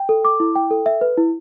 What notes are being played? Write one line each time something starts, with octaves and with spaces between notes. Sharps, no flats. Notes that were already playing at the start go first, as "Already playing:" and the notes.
Already playing: G5
A4
D6
E4
G5
A4
E5
B4
E4